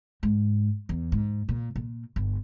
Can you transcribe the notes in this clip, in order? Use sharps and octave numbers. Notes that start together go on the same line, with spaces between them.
G#2
E2
G#2
A#2
A#2
G1